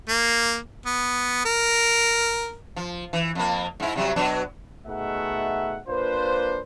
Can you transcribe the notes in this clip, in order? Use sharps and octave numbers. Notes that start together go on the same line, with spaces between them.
A#3
B3
A#4
F3
E3
F2 A#3
G#2 E4
C3 F#3 G3
B2 F#3 D4
B2 A3 D#4 G#4 E5 F#5
A#3 D4 F4 B4 C5